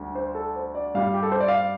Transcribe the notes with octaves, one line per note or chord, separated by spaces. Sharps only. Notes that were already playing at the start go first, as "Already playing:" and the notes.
Already playing: D2 D3 G3
C5
A4
C5
D5
G2 G3 F5
G4
A4
C5
D5
F5